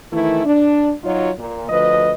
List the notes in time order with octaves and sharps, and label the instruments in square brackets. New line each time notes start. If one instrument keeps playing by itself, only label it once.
[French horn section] D#3 E3 A3 E4
D4
F#3 D#4 F4 F#4 C#5
A#2
D2 F3 B4 D#5